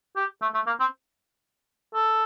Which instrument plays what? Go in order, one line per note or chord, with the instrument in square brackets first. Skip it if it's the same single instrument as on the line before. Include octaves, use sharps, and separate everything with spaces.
[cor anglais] G4
A3
A3
A#3
C4
A4